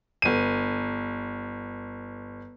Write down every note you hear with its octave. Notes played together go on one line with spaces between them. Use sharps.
G1 D#7